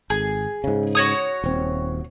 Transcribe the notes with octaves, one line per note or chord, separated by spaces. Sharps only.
G#1 G#4
G#2 C#3
F#4 C#5 D#6
D#1 C4